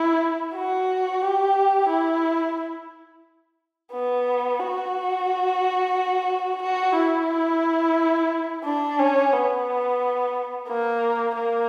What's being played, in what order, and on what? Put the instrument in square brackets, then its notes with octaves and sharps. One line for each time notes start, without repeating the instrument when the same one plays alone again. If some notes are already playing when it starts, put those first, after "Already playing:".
Already playing: [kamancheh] E4
F#4
G4
E4
B3
F#4
F#4
E4
D4
C#4
B3
A#3
A#3